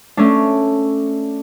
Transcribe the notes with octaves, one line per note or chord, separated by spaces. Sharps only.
A3 C#4 D4